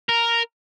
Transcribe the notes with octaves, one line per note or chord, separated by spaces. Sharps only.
A#4